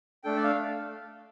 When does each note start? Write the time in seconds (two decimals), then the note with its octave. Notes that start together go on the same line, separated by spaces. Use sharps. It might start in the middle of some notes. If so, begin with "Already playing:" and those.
0.24 A3 D4 A4 G5
0.36 D5
0.44 F5